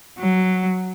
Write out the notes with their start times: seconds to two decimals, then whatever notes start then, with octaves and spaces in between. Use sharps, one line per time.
0.19 F#3